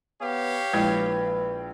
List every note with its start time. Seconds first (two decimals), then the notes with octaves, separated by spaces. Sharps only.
0.21 B3 G4 C#5 F5
0.73 A#1 G#3 E4 B4 G5 G#6